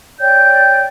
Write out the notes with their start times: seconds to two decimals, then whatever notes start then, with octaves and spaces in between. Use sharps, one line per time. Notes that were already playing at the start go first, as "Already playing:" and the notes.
0.19 C#5 D5 G5 G6